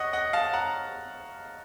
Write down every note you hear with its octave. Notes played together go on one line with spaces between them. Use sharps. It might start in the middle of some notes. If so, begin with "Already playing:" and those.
Already playing: C#5 D#5 F#5
D#5 F#5
F5 A5
F#5 A#5